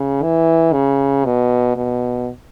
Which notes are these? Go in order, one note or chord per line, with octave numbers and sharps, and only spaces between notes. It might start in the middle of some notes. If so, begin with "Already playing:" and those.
Already playing: C#3
E3
C#3
B2
B2